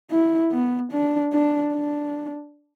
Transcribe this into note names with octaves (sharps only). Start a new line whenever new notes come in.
E4
B3
D4
D4
D4